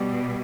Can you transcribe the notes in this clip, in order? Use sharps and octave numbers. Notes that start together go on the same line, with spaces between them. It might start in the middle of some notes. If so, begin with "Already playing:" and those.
Already playing: B2 G3